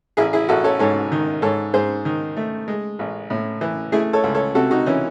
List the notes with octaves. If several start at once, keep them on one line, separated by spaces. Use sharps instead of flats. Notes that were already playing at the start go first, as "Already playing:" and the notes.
A1 E4 G#4
E4 G#4
A1 F#4 A4
A4 C#5
G#2 A4 C#5
D#3
G#2 A4 C#5
G#2 G#4 C5
D#3
A3
G#3
A1
A2
E3
A3 E4 G#4
A4 C#5
C#2
A4 C#5
C3 F#4 A4
D#4 F#4
E3 C#4